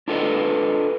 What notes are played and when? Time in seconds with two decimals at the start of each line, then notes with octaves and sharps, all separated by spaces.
0.08 D4 F4 A4 B4 D#5